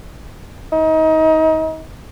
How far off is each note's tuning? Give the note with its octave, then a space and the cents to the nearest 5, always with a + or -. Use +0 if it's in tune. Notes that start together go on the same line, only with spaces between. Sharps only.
D#4 +30